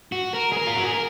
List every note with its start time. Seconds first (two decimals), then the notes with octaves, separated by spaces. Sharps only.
0.12 F#4
0.34 A#4
0.52 G#4
0.57 A#4
0.67 F4
0.76 F#4
0.85 G#4
0.93 A#4